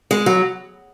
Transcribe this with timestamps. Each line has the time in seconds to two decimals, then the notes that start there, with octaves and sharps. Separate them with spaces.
0.11 G#3
0.26 F#3